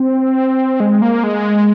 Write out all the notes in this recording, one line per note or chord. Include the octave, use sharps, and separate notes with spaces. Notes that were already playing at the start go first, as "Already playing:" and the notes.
Already playing: C4
G#3
A#3
G#3